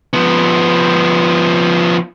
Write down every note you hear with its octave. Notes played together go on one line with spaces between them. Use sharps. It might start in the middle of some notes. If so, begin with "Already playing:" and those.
F3 B3